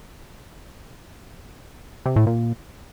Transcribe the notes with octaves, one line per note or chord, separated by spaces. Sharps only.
C3
A2
A#2